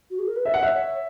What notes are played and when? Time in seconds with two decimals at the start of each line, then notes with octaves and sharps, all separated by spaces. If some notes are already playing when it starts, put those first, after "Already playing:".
0.11 F#4
0.19 G#4
0.28 A#4
0.36 B4
0.45 C#5 E5
0.54 F#5
0.63 E5
0.74 C#5